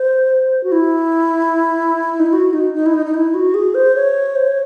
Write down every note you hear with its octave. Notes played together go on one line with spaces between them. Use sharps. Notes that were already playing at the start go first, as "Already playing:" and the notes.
Already playing: C5
F#4
E4
D#4
E4
F#4
D#4
D#4
E4
D#4
D#4
E4
F#4
G#4
C5
C#5
C5
C#5